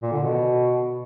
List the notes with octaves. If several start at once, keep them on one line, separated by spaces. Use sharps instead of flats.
A#2
D3
B2